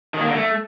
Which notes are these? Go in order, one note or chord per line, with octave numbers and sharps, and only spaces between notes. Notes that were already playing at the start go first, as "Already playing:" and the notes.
D#3
A#3
D3
A3